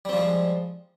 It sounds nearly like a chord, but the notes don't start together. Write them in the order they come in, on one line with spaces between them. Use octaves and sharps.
G3 C4 F3 G#3